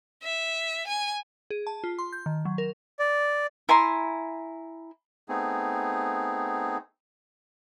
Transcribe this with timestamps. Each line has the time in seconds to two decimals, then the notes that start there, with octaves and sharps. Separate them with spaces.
0.24 E5
0.87 G#5
1.50 G#4
1.67 A5
1.84 F4
1.99 C6
2.13 G6
2.26 D#3
2.45 F#3
2.58 A#4
2.99 D5
3.69 E4 G#5 A#5 C6
5.29 A3 B3 C4 D#4 G#4